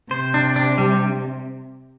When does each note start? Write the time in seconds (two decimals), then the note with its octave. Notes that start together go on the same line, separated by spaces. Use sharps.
0.11 C3 C5
0.34 D4
0.56 D4
0.78 G3